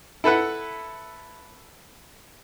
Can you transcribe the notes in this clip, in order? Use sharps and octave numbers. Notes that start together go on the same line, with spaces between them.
E4 A4 B4 F#5